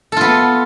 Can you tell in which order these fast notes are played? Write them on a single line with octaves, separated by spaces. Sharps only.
A4 F4 B3